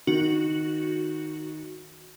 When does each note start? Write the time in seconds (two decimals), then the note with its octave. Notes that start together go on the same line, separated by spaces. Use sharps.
0.07 D#3 F#4